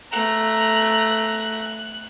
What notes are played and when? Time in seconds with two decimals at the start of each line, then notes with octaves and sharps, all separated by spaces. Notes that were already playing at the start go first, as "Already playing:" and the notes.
0.12 A3 A#5 F#6